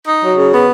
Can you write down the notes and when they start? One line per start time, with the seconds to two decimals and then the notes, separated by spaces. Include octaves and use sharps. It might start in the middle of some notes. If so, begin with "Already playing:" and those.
0.05 D#4
0.20 F#3
0.36 C#3
0.51 B3